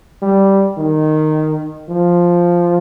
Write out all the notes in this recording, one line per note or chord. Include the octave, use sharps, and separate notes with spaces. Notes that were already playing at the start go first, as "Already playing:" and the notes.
G3
D#3
F3